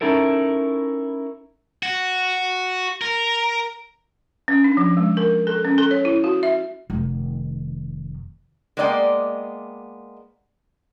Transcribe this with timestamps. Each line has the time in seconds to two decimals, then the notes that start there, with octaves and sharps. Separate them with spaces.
0.01 C#4 D#4 E4 A4 A#4
1.83 F#4
3.01 A#4
4.48 C#4
4.64 D4
4.77 F3
4.97 G#3
5.17 A#4
5.47 A4
5.65 C#4
5.78 A4
5.91 C#5
6.05 E4
6.24 F#4
6.43 E5
6.90 F1 D#3
8.77 G#3 A#3 B3 D5 D#5 G5